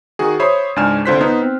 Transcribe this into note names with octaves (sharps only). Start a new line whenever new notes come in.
D#3 F#4 G#4
C5 C#5 E5 B5 D#6 C7
C#2 G#2 D4 G#5 F6 E7
C2 D3 F4 C5 F#6 B6
B3 D#4 C5
C4